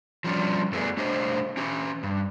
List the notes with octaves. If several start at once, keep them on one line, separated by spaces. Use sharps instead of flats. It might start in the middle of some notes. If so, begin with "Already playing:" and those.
F3 G3 C#4 D4
F#2 A3 B3 G#4 B4 D5
A3 D4 G4 C5 C#5 D#5
C#4 G4
G2